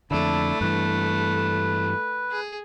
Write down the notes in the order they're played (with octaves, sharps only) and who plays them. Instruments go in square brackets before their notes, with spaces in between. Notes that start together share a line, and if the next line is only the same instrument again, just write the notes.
[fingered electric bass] F2 D3 [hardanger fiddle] A3 [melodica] D4 E4
[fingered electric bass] G2 E3 [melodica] B4
[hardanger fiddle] G#4